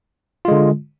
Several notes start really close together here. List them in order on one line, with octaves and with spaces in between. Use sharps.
F4 G#3 D3